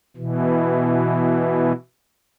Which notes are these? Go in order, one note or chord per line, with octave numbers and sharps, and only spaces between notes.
B2 E3